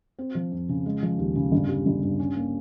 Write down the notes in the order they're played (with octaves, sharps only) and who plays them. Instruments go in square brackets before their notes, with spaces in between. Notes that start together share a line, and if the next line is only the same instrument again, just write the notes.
[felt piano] C4
F3
F2
C#3
G#3
F3
D#2
C#3
G1
G3
G1
G2
C#4
A#3